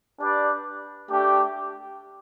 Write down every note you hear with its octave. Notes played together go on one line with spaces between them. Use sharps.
D4 G4 B4 D5
A3 D4 G4